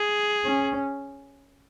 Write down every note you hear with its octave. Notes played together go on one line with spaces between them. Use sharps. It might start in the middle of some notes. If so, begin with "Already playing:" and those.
Already playing: G#4
C#4